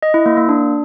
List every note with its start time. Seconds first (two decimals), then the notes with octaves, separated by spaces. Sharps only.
0.03 D#5
0.14 E4
0.26 A#3
0.37 A#3
0.49 D4